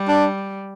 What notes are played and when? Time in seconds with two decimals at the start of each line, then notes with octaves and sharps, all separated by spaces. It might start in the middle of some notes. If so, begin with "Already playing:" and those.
Already playing: G3
0.08 D4